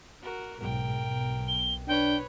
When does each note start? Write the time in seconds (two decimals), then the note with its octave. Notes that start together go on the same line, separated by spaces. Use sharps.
0.22 F#4 A#4
0.59 B1 G#2 A#4 G5
1.04 B1
1.48 G7
1.88 D4 B4 C#5 G5